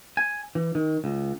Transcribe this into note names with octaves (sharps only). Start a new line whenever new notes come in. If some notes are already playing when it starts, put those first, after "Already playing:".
G#5
E3
D#3
C#2